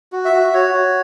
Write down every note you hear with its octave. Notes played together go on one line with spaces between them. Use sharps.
F#4
E5
F#4
F#4 C#5
F#4